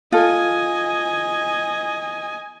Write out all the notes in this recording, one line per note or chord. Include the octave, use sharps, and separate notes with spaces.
F4 A4 D#5 G#5